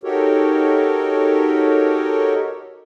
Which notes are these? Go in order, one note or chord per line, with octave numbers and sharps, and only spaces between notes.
D#4 F#4 G4 A4 A#4 C#5